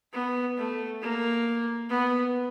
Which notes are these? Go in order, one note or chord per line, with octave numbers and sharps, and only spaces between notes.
B3
A3
A#3
B3